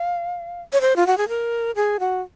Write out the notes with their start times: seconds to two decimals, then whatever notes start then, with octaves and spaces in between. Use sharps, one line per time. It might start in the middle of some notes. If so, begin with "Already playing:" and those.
Already playing: F5
0.73 C#5
0.81 C5
0.96 F4
1.07 F#4
1.17 G#4
1.28 A#4
1.76 G#4
2.00 F#4